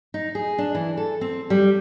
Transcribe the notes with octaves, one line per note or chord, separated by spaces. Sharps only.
D#4
G#4
D4
E3
A4
C4
G3